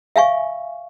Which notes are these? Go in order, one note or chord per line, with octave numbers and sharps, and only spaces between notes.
E5 F5 G#5 C#6